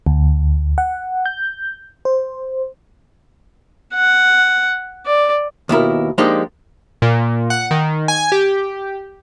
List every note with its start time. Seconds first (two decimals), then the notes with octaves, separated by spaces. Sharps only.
0.07 D2
0.78 F#5
1.26 G6
2.05 C5
3.95 F#5
5.06 D5
5.69 D#2 B2 E4 A#4
6.18 F3 G#3 A#3 D4 D#4 G4
7.02 A#2
7.50 F#5
7.71 D#3
8.08 G#5
8.32 G4